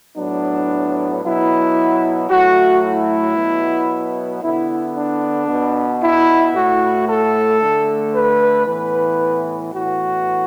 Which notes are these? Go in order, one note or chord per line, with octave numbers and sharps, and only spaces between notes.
A2 F#3 B3 D4
B2 F#3 B3 E4
A2 F#3 A3 F#4
E4
B2 F#3 B3
D3 B3 E4
D4
B2 B3
E4
A2 A3 F#4
A4
D3 A3
B4
A2 E3 B3 B4
A2 E3 B3 F#4